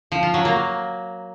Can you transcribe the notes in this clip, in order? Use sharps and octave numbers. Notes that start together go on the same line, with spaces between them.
F3
F4
F#3
A#3